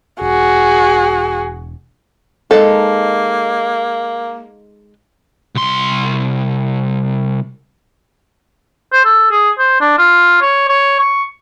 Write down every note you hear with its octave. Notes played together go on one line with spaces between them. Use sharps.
E1 F#4 G#4
G#3 A#3 D#4 A4
C2 C6
C5
A4
G#4
C5
D4
F4
C#5
C#5
C#6